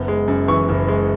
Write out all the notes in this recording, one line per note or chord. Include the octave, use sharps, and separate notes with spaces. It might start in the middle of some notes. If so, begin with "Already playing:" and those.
Already playing: F#1 B3
G#3
F#2
E3 C#6
F#1
G#3